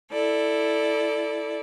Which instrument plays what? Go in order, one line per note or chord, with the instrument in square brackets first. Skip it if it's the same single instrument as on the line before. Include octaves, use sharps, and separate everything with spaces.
[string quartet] E4 A4 D5